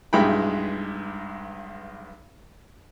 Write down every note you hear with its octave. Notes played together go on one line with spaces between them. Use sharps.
B1 G2 G#3 E4 G5 B5